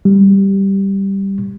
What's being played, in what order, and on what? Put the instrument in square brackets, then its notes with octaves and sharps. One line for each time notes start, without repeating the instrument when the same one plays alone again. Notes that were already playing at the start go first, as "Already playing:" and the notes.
[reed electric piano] G3